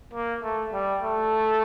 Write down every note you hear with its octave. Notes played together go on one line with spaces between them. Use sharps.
A#3
A3
G3
A3